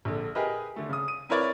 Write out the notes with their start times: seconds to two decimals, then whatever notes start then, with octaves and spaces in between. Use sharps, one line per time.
0.05 A#1 D3
0.35 G4 G#4 A#4 B4 D#5
0.76 D3 A3
0.89 C#3 D#6
1.08 D#7
1.29 C4 E4 A#4 B4 C#5 D5